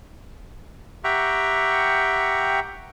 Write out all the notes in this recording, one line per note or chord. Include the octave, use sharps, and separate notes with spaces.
G4 E5 F#5 G5 A#5 C#6